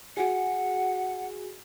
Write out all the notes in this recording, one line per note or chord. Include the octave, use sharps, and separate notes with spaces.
F#4 G#4 F#5